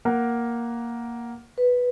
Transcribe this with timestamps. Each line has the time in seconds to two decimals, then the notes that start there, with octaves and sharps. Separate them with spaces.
0.05 A#3 A#4 F#5
1.58 B4